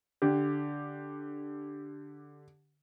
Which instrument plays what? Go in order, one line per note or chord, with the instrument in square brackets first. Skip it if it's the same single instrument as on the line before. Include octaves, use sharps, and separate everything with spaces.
[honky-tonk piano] D3 G4